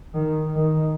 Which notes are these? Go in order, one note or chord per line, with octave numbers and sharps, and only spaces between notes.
D#3
D#3